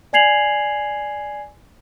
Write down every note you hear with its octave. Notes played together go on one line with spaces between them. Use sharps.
D5 G#5 G#6 C7 F7 F#7